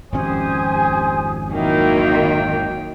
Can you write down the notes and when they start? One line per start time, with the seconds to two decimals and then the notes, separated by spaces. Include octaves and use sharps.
0.12 G#1 F2 C#4 G4 C5 G#5 D#6
1.52 D#3 F#3 A#3 E4 G5